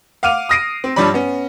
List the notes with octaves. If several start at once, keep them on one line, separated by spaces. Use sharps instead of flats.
F5 F#5 D6 F6 D#7 F7
D#6 F6 A#6 C7 D7 D#7
C4
G2 F3 G3 C#5 D5 B5
B3 C#4